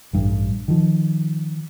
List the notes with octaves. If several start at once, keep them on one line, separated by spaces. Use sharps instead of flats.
A1 G2
D#3 F3